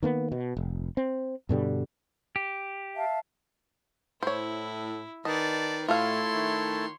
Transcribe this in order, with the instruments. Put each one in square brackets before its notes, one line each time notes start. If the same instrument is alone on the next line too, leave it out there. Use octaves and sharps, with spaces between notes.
[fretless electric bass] D#3 A#3 B3
B2
F1
C4
G2 B2 D3 G3
[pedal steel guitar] G4
[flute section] E5 F5 A5
[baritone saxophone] A2 [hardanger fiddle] E4 [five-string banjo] C5 C#5
[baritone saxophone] D#3 [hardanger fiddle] B4 D5 [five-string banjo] D#5 [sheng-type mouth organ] A5
[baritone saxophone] A2 [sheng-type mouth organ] A3 E4 A5 [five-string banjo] F4 F5 [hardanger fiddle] C#5 C6
[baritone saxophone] D#3